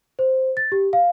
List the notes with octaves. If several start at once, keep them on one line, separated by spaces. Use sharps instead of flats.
C5
A6
G4
F5